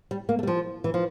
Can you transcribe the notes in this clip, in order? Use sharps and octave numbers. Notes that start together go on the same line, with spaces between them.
G3
A#3
A3
G3
F3
E3
F3